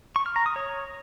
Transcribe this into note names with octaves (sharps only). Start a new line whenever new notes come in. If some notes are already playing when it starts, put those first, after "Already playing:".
C#6
F6
A#5
D#6
C#5